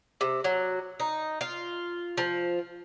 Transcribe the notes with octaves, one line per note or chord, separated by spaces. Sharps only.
C3
F#3
D#4
F4
F3